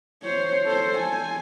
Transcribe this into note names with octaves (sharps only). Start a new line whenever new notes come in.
C5 C#5
A4 C5
G#5